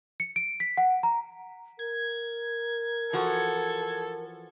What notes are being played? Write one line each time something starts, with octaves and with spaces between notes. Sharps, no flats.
C#7
D7
B6
F#5
A#5
A#4 G#6
E3 F3 F#4 A4